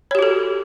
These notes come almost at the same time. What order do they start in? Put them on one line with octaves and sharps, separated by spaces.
C#5 G4 F#4 A4